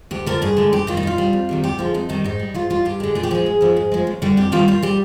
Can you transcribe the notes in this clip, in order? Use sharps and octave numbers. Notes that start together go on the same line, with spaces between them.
D2 G4
D3 F3 A#4
G2 G#4
D3 G#3
G2 G4
D#3 G3 F4
D#4
A#2 F4
G3
F2
C3 D#3 G3
D2 G4
D3 F3 G#3 F4
F2 D#4
D#3 G3 D#4
G#2 D#4
G3
G#2 F4
G3 F4
G2 G4
D3 G#3
A#2 G#4
G4
F3 G#3 G#4
G#2
F3 G#3
G#2
F3 G#3
D#2
D3 G3
F2 G4
D#3 G3 F4
A#2 F4
G3 G4